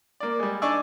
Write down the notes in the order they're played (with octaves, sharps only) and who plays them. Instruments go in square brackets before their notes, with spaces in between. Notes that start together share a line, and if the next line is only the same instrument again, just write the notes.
[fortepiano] A#3 D5
G3 G#3
D4 D#4 D5 G#5 C#6 E6